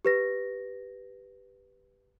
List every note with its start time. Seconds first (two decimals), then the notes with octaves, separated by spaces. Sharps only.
0.05 G4 B4 A#6